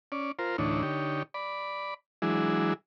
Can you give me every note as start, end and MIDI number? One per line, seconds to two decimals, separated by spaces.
0.12 0.32 61
0.12 0.32 74
0.39 0.57 65
0.39 0.57 70
0.39 0.57 72
0.58 0.83 38
0.58 0.83 45
0.58 0.83 52
0.58 0.83 62
0.58 0.83 63
0.58 0.83 73
0.83 1.23 50
0.83 1.23 63
0.83 1.23 67
0.83 1.23 73
1.34 1.94 74
1.34 1.94 83
2.22 2.73 52
2.22 2.73 54
2.22 2.73 56
2.22 2.73 62
2.22 2.73 64
2.22 2.73 68